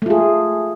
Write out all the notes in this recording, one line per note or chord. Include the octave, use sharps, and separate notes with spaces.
A3 F4 G#4